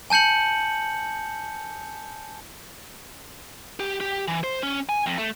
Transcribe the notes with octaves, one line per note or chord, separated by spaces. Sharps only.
G#5 A5 G6 C#7 F#7
G4
G4
E3
C5
C#4
G#5
F2
A3